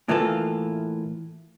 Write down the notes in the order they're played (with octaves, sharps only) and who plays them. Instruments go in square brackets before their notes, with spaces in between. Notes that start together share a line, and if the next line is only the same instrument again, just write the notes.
[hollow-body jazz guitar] A2 E3 A#3 F4 A4